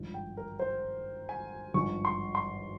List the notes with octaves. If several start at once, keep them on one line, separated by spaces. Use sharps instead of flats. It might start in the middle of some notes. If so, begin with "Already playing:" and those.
Already playing: G#1 G2 F3
G5
A#4
C5
G#5
G#1 G2 F3 C#6
C6
C6